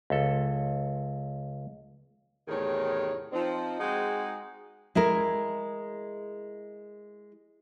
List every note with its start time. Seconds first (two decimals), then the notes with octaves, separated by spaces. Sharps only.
0.10 C#2 A4
2.48 E2 A2 C3 D#3 G#4 C#5
3.33 F3 C4 D#4
3.80 G#3 C4 D#4 F#4 G#4
4.95 G#3 E4 G#4 A#4